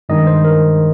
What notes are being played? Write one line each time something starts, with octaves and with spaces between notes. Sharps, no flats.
G2 D#3 G#3 D#4 D#5
C5
A#4